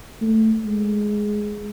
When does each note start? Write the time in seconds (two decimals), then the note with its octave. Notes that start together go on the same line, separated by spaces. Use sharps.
0.21 A3
0.64 G#3